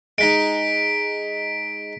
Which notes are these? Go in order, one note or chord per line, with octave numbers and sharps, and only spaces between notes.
G#3 D#4 B6 D7